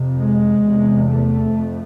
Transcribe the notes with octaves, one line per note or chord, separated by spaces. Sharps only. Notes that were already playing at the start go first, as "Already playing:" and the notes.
Already playing: F2 C3
G#3
E2 C3
A3
F2